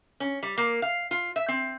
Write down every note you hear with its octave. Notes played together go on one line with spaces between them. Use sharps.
C#4
G3
A#3
F5
F4
E5
C4